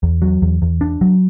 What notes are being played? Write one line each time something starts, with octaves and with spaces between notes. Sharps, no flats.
E2
F#3
E2
E2
D4
F#3